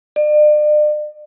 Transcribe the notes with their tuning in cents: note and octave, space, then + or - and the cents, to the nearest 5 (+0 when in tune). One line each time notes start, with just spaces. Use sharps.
D5 +40